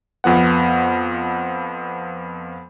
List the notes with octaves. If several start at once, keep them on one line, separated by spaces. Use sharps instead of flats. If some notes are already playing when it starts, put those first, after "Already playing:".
F2 F3 B3 F#5